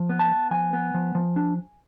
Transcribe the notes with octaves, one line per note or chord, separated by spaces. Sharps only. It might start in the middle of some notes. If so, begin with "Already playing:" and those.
Already playing: F3
B3
A5
B3
F3 G#5
B3
F3
F3
D4